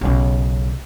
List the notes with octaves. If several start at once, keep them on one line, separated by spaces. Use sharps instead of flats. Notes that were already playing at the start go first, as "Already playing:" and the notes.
B1 C#3